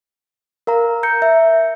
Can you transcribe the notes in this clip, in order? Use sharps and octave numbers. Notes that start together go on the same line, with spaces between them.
A#4 F5 A#5
A#5 G6 C#7
E5